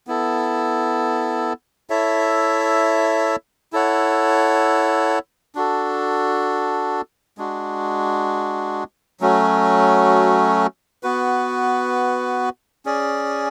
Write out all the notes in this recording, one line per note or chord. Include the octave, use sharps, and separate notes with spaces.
B3 E4 A4
E4 A4 C#5 E5
E4 A4 C#5 F#5
D4 F#4 A4
G#3 D4 F#4
F#3 A3 C#4 F#4
B3 F#4 B4
C#4 G#4 D5